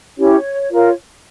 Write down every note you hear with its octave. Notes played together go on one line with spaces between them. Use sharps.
C#4 E4 G4 C#5
F4 A#4 C#5